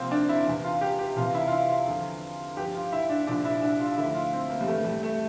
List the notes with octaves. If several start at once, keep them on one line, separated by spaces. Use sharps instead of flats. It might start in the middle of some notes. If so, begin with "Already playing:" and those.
Already playing: C2 C3 F3 A#3 C4
D4
E4
E2 C3 E3
F4
G4
G4
C2 C3 E3 F4
E4
F4
E4
F4
E2 D3 F3
G2 F3 G4
F4
E4
D4
C2 A#2 F3 D4
E4
D4
F4
D2 D3 F3 E4
F4
C4
A#3
G3
G2 E3 A3
G3
A3